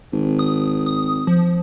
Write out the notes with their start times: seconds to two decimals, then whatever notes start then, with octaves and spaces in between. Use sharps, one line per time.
0.13 G#1
0.39 D#6
0.86 D#6
1.27 F3